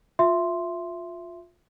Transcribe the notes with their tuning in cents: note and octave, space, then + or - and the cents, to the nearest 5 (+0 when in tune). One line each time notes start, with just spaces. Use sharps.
F4 +20 E5 +15 C6 +0